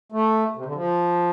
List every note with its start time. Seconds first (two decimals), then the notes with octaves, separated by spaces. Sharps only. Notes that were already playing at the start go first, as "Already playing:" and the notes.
0.12 A3
0.56 C3
0.66 D3
0.75 F3